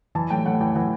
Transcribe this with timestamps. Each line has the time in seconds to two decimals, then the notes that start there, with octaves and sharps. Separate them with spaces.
0.15 E3 A5
0.30 A2 G5
0.45 A2 F#5
0.60 E3 G5
0.75 E3 F#5